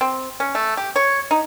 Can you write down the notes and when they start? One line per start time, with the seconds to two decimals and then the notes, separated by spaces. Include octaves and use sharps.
0.01 C4
0.40 C#4
0.55 A3
0.77 G4
0.96 C#5
1.31 D#4